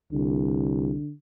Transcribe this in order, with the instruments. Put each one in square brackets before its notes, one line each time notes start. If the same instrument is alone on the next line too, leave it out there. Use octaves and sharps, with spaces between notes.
[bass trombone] C2 [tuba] D3